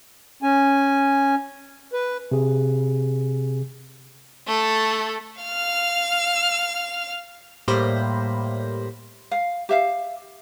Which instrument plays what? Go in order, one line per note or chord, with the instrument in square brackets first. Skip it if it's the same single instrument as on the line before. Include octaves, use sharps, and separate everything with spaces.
[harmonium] C#4 G#5
B4
[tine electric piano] C3 G#4
[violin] A3 A4
F5 F6
[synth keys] A2 G3 A#3 C5 B5 A#6
[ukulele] F5
G4 E5 F5